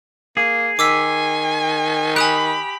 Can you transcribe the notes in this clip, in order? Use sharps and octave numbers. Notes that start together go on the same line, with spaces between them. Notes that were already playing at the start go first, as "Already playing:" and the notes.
A#3 G#4
D#3 G#5 D6 E6 B6
G4 G#5 B5 D#6 F#6